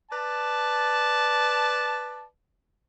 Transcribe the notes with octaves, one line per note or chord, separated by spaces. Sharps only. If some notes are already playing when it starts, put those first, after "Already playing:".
B4 D5 A5